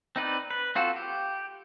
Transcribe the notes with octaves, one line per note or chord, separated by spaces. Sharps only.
C4 D#4 B4 D5
B4
C4 F4 F#4 A4
G4